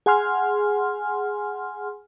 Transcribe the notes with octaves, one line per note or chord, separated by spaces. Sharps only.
G#4 F#5 G#5 C6 F6